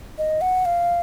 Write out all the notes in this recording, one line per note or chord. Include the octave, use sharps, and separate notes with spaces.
D#5
F#5
F5